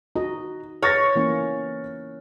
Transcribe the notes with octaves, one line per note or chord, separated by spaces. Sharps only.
D#4 F#4 D#5
C#5 F6 A6 A#6
E3 A#3 C#4